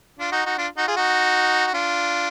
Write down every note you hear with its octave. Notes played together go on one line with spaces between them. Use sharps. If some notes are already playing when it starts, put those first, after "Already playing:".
D4 F4
D#4 F#4
D#4 F#4
D4 F4
D#4 F#4
F4 G#4
D#4 F#4
F#4
D4 F4